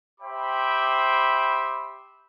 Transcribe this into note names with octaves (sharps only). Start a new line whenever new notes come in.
G4 C5 E5 G5 B5 D6